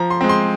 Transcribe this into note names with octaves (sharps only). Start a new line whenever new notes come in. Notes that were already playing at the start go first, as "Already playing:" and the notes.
Already playing: F3 A#5
C6
G#3 C4
C6